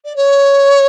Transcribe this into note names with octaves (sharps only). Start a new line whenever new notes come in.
D5
C#5